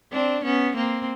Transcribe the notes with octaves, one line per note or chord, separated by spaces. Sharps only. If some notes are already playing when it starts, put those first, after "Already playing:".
C4 D4
B3 C#4
A#3 C4